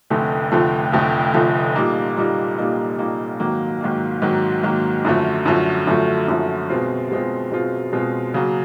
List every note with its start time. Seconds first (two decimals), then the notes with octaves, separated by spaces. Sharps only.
0.10 F1 F2 D3 F3 A3
0.52 F1 F2 D3 F3 A3
0.92 F1 F2 D3 F3 A3
1.34 F1 F2 D3 F3 A3
1.75 A#2 G3 A#3 D#4
2.16 A#2 G3 A#3 D#4
2.58 A#2 G3 A#3 D#4
2.99 A#2 G3 A#3 D#4
3.40 G#2 D#3 F#3 A#3
3.81 G#2 D#3 F#3 A#3
4.22 G#2 D#3 F#3 A#3
4.63 G#2 D#3 F#3 A#3
5.05 F#2 D3 F3 A3
5.45 F#2 D3 F3 A3
5.87 F#2 D3 F3 A3
6.28 F#2 D3 F3 A3
6.69 B2 G#3 C4 F4
7.11 B2 G#3 C4 F4
7.52 B2 G#3 C4 F4
7.93 B2 G#3 C4 F4
8.34 C#3 F#3 A#3